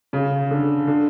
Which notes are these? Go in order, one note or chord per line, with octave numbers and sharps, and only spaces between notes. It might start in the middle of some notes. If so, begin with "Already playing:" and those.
C#3
D3
D3